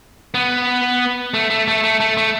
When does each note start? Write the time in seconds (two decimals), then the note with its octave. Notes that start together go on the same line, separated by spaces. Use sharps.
0.34 B3
1.34 A3
1.50 A3
1.68 A3
1.84 A3
2.00 A3
2.17 A3